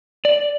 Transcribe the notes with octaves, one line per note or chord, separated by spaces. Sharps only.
D5